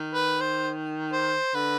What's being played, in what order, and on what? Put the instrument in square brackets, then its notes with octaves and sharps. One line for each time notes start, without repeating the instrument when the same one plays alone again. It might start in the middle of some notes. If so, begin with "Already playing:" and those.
Already playing: [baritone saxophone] D#3
[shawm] B4
C5
C5
[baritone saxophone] D3 [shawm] B4